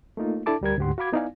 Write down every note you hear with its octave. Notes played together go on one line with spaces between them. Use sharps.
A3 A#3 D#4 F4
D4 E4 A4 A5 D6
D2 G3 A#4 G#6
D2 G#2 D3 G4 F#5 C6
F#4 F5 B5 D6 G#6
B3 D#4 E4 D5 F5 G#5